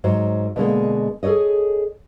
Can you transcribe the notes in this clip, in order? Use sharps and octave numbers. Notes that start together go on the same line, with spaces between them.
G#2 F#3 C5
B2 D3 G#3 A#3
G#4 A4 B4 C#5 D#5